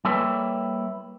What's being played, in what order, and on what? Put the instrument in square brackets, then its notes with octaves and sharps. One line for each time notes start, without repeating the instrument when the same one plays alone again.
[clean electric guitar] G3 A#3 E4 A4 B4 C#5